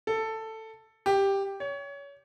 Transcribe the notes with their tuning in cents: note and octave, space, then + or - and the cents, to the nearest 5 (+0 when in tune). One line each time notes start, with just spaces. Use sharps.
A4 +10
G4 +5
C#5 +25